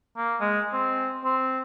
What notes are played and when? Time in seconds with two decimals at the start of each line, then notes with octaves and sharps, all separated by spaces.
0.17 A#3
0.40 G#3
0.73 C4
1.24 C4